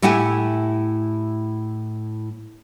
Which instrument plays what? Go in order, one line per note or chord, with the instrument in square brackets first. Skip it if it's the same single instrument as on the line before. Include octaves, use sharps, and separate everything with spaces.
[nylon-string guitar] A2 A3 E4 G4 F#5 G#5